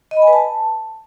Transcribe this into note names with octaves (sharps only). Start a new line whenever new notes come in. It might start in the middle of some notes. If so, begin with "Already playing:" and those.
D#5
B5
G#5
B4
A5